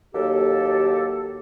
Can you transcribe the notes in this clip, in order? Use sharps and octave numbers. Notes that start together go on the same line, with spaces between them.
D#2 F#3 A#3 G4 A4